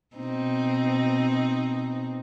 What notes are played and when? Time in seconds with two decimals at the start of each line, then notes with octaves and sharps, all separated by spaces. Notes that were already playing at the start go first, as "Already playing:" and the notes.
0.16 B2 C4 D#4